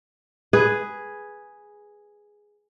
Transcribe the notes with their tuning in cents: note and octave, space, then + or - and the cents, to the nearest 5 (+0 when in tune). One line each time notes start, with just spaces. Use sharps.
G#4 +0 B4 +0